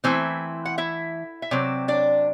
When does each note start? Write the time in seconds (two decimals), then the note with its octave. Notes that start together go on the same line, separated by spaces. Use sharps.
0.04 E3 A3 C4 E4 C5
0.65 F#5
0.78 E4 E5
1.42 E5
1.51 C3 F#3 C4 D5
1.88 D4 D5